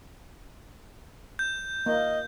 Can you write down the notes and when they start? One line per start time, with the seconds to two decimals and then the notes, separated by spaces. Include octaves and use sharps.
1.39 G6
1.86 A#3 D#5